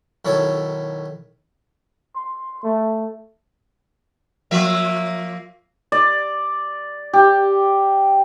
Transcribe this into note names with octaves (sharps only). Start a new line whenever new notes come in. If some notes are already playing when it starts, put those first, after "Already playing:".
B1 D#3 E4 A4 C#5
C6
A3
F3 A#3 E5
D5
G4